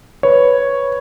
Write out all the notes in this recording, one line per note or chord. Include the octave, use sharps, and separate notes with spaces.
B4 C#5